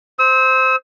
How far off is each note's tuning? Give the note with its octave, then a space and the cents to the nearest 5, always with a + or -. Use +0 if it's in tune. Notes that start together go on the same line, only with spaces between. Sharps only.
C5 +0 E6 -35